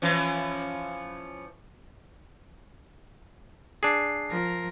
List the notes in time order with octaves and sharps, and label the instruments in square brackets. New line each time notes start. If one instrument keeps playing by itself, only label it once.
[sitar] E3 F3 C#4
[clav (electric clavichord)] D4 G#4 [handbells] C7
[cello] F3 A#4